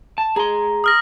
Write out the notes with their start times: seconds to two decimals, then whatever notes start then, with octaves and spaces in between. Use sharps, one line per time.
0.18 A5
0.36 G#4 A#5 C6
0.84 D#6 F6 A#6